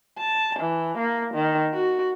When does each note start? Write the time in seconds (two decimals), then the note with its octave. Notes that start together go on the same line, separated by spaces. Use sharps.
0.18 A5
0.59 E3
0.98 A#3
1.34 D#3
1.74 F#4